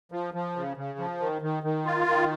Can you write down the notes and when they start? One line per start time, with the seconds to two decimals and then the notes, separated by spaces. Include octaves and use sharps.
0.12 F3
0.34 F3
0.56 C#3
0.77 C#3
0.99 F3
1.20 D#3
1.42 D#3
1.63 D#3
1.85 F4
2.07 D#3